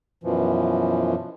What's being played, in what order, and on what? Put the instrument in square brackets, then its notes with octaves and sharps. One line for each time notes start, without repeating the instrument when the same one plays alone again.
[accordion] F#2 B2 E3 F3